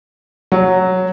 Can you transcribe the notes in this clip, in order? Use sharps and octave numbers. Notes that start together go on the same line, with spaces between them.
F#3